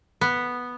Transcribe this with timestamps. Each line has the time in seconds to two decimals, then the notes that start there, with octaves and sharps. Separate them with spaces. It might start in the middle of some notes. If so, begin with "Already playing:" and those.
0.21 B3